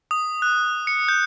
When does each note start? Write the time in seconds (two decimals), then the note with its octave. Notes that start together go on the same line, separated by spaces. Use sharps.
0.11 D#6
0.42 F#6
0.87 C#7
1.08 G6